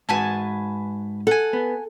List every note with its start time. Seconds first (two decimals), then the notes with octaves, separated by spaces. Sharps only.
0.09 G#2 F#4 B4 G#5 A5
1.27 A4 F#5 G#5
1.53 B3